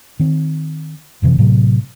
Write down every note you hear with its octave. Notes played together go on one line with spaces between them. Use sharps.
D#3 C4
E1 F2 C3 E3
A2 C3 F#3